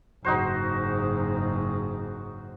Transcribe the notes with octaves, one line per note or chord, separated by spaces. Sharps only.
F#1 G#2 D#4 F#4 C5